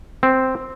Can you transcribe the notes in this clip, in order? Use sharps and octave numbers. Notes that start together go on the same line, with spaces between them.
C4